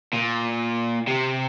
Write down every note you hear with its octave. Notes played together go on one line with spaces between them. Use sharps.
A#2
C3